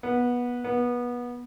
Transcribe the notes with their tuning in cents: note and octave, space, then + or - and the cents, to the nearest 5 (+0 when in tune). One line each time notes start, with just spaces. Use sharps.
B3 -20
B3 -25